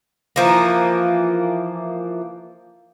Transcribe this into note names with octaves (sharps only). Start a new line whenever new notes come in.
E3 F3 A#3